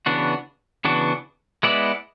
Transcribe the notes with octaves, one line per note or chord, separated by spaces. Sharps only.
C#3 E3 B3 D4 F#4
C#3 E3 B3 D4 F#4
G#3 B3 E4 B4 D5